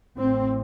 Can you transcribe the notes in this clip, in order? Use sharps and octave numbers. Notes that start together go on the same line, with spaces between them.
A1 A2 C4